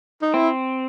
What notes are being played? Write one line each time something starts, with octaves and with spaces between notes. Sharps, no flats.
D#4
C4 E4